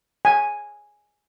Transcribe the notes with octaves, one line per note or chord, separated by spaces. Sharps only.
G#5